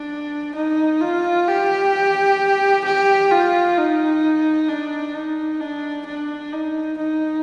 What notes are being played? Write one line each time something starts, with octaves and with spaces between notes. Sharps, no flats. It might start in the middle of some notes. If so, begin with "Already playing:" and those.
Already playing: D4
D#4
F4
G4
G4
F4
D#4
D4
D#4
D4
D4
D#4
D#4